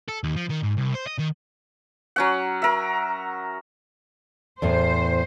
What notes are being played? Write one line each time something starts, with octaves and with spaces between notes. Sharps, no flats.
A4
D#2
F3
D#3
G#2
C2
C5
D#5
D#3
F#3 C#4 F#5
A#4 E5
E2 A2 A3 C5